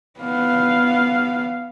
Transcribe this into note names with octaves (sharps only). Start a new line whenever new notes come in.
B3 F5